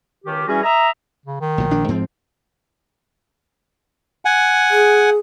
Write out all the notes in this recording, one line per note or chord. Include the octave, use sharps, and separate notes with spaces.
C#2 D#3 G4
E3 G3 C#4 F#4 G#4
D#5 E5 A#5
C#3
D#3
B1 A#2
A#1 D4
G#2 F3 C4
F#5 G#5
G#4